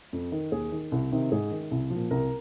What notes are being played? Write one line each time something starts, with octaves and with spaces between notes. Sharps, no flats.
F2
D#3
D#2 G#4
D#3
C2
C3 D#3
G#2 G#4
D#3
C2
F3
A#2
C2 A#4